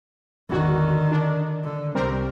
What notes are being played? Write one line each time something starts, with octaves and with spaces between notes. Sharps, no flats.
G#1 E2 D3 D#3 F#4
D4
D3
C2 G3 C4 A#4